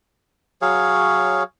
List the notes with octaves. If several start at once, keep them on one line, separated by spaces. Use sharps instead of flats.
F#3 G#4 C#5 F5